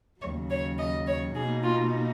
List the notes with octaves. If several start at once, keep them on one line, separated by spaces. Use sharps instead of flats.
D#2 C#3 F#3 C#5
C#5
D#5
C#5
B2 A#3 D#4 G#4
F4